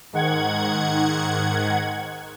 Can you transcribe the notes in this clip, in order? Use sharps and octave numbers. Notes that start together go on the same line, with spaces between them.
G#2 D#3 F#5 G#6